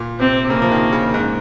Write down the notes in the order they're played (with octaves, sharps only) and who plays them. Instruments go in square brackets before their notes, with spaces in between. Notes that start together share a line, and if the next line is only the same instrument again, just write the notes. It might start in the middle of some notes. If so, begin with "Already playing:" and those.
Already playing: [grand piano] A#2
[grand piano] C3 [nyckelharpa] C4
[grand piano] C3
[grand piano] C#3 [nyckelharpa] A#3
[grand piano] F3
D#3
C#3
G#2